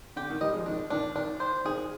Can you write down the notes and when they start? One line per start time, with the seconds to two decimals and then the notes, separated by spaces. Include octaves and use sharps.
0.16 D3 G4
0.30 D#3
0.41 D#3 G3 D#5
0.54 F3 G#3
0.66 D#3 D4
0.90 D#3 D4
1.15 D#3 D4
1.40 C5
1.65 D#3 G#4